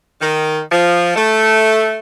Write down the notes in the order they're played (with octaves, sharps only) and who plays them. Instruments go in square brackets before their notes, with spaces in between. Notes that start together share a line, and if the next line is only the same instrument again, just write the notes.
[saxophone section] D#3
F3
A3